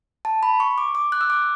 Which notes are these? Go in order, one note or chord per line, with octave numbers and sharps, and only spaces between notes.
A5
B5
C#6
D6
D6
F#6
E6
D6